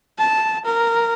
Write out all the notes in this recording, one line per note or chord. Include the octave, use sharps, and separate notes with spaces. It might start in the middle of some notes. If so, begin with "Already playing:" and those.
A5
A#4